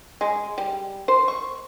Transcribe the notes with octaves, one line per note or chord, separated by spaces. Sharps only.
G#3
G3
C5
C#6